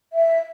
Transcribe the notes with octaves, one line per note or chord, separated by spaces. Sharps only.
E5